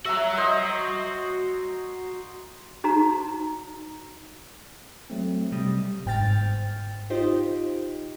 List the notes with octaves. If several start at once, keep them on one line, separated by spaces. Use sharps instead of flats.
F#4 E5 A#5
C5 D#5
D#4 F#4 A#5
F#3 A3 C4
C3 G3 D#5
G1 G#2 G5 F6 A6
D#4 F4 G4 C5 D#5